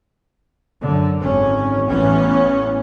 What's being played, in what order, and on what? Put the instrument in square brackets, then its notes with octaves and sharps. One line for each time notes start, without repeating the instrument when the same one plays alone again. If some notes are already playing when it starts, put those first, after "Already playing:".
[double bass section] F#2 D3
G#1 C#4
A1 E3 B3 C#4